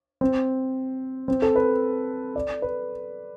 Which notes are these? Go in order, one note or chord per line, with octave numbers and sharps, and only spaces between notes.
C4
C4
A4
B4
D5
B4